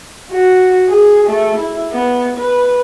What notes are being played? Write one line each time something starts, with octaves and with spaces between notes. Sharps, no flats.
F#4
G#4
A3
E4
B3
B4